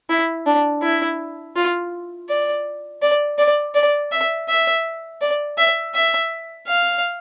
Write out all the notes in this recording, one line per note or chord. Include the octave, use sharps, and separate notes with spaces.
E4
D4
E4
F4
D5
D5
D5
D5
E5
E5
D5
E5
E5
F5